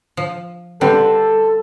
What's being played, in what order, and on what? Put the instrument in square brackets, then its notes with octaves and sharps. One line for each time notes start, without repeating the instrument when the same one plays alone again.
[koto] F3
[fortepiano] D3 C4 B4 [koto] G3 [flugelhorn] A4